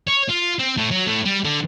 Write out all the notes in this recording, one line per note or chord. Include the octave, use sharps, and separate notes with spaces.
C#5
F4
C4
A2
F#3
A2
G3
D3